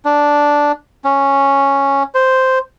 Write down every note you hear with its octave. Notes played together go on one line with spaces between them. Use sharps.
D4
C#4
C5